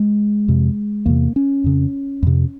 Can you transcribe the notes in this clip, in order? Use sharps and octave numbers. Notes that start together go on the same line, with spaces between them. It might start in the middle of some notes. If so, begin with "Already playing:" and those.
Already playing: G#3
F2 C3
E2 C3 A#3
C#4
F2 C#3
F2 C3